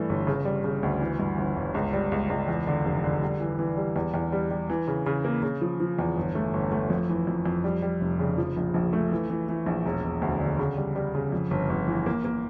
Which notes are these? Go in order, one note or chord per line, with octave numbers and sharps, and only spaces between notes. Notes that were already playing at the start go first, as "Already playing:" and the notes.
Already playing: G2 E3 A3
G1
C#3
G3
C#3
D2
E3
G2
G1
G1
C#2
G3
C#2
C#2
E2
D3
F1
D3
G3
E3
E3
G3
E2
E2
G3
G3
E3
C#3
C#3
A#3
C#3
F3
F3
E2
G1
A3
G1
A3
F2
E3
F2
F2
G3
G3
F1
C#3
F3
A#1
A#1
A3
E3
E3
E3
A#1
E1
E1
D2
D3
C#3
G3
G3
C#3
F2
G1
G1
E3
A#3
A#3